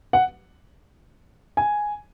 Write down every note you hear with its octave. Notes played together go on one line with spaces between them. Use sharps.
F#5
G#5